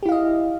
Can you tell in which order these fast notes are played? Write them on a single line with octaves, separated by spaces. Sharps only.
G4 E4 F5 D#5